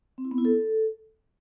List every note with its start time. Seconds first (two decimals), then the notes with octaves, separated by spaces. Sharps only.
0.18 C4
0.25 E4
0.31 B3
0.38 E4
0.45 A4